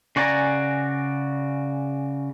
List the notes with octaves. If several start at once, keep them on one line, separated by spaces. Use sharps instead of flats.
C#3 F#4 D5 G#5 A#5